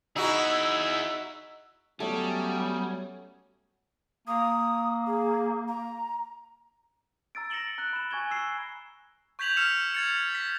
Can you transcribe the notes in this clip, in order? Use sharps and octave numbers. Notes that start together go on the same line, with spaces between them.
D#4 E4 F#4 G#4 E6
F#3 G3 A3 B3 C#4 C#5 D#6
A#3 D#6
G#4
A#5
A#5 E6 A6 D7
A6 A#6 C#7 E7 F#7 G7
A#5 F#6 D7
B5 E7
G#5 C#6 G#6 E7 G7
E6 C7 E7
C#6 G6 G#6 B6 F7 F#7
E6 F6 B6 C#7 E7 F7
G#6 A6 C#7
B6